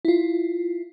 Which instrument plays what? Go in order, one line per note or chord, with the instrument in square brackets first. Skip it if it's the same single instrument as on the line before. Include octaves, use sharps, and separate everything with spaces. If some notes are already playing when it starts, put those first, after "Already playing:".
[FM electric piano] E4 F4